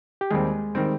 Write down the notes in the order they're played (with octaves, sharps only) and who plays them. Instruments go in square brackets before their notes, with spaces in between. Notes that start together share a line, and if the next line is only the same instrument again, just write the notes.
[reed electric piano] G4
[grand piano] D#2 D#3 G3 C4 [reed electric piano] G#3 G#4
[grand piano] D#3 G3 C4